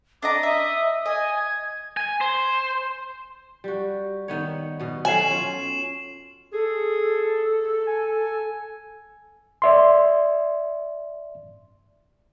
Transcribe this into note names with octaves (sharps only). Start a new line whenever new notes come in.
D4 D#5 A#5 D6
D#5 E5
D#5 G#5
G#6
G#5
C5
G3 F#4
D#3 B3 C#5
B2 B3
F#3 A4 G#5 C7 E7 F#7
C#4 F4 C#5
G#4 A4
G#5
D5 E5 C6